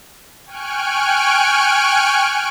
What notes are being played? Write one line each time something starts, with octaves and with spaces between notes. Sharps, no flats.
G5 G#5 C#6 F6 F#6 D7